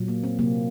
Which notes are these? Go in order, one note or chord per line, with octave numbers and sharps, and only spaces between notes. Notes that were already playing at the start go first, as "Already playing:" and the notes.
Already playing: A#2 F#3
A#3
C4
C3 F#3 A#3